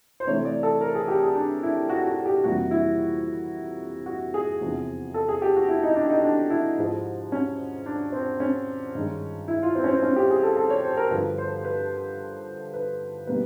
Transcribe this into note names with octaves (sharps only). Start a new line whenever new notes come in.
C5
C3 E3 A3 C#5
D5
A4
A#4
G#4
G4
G#4
D4
E4
F#4
F#4
G4
F2 C3 E3 G3 A#3 F#4
E4
F#4
G#4
E2 C3 F3
A4
G#4
G4
F#4
E4
D#4
D4
D#4
D4
E4
G#2 F3 G#3
C#4
D4
C4
C#4
G2 D#3 G#3
E4
F4
C4
C#4
C4
C#4
G4
G#4
A4
A4
C#5
C5
A#4
G2 D3 F3 B4
C5
B4
B4
B2 G3 A#3 B4